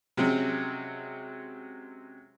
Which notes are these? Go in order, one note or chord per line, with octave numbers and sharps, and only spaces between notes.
C3 F#3 G#3 C4 C#4